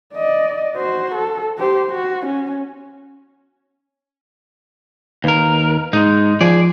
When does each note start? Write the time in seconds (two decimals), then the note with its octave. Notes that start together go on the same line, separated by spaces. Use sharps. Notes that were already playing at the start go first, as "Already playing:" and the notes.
0.14 D5 D#5
0.75 F#4 C5
1.15 A4
1.58 G4 C5
1.90 F#4
2.26 C#4
5.24 D#2 A#4 B4
5.93 G#2 G#3 D#4
6.41 F3 G#4 D5